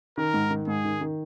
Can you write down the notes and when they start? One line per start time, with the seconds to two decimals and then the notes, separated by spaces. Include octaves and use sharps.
0.17 D#3 A#4
0.34 G#2
0.50 D#3
0.67 G#2 G#4
0.85 D#3
1.01 D#3